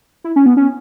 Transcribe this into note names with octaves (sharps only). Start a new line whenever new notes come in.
E4
C#4
B3
C#4